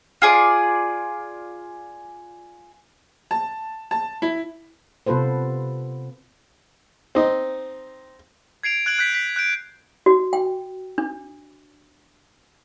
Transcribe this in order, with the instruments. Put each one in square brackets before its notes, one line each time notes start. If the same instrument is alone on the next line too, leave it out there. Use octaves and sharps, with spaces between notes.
[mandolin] F4 G#4 D5
[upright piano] A5
A5
E4
[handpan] C3 B3 F4 A4 B4 C5
[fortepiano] C4 D#4
[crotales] G#6 C7 D7 F7
F#6 G#6 D7 F#7
F#6 G6 B6
B6
F#6 G6 D7
[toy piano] F#4
G5
D4